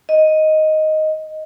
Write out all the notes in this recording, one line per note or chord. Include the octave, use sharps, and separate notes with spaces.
D#5